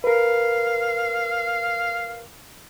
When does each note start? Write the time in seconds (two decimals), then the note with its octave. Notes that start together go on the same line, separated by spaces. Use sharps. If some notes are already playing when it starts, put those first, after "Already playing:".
0.04 A#4 B4 F5